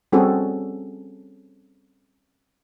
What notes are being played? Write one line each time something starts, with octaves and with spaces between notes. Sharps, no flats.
G3 C4 C#4 F#4 G#4 A4